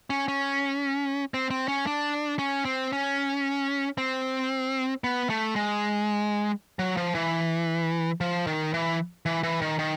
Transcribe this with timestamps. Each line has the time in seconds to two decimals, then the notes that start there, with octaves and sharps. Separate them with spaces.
0.10 C#4
0.28 C#4
1.34 C4
1.51 C4
1.68 C#4
1.87 D4
2.39 C#4
2.65 C4
2.93 C#4
3.98 C4
5.04 B3
5.30 A3
5.56 G#3
6.79 F#3
6.97 F3
7.15 E3
8.21 F3
8.47 D#3
8.74 E3
9.26 E3
9.43 E3
9.61 D#3
9.79 D#3